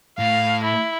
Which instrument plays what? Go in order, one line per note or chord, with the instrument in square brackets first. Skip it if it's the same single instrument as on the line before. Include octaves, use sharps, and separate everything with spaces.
[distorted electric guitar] A2 [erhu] F5
[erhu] E4